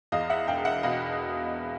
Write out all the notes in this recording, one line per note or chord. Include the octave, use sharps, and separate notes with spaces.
E2 D#5 F5
E5 F#5
E1 F5 G5
E5 F#5
B2 D#5 F5